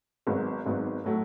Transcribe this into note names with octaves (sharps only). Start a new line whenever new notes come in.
G#1 G#2 F#3 B3
G#1 G#2 F#3 B3
A2 F#3 A3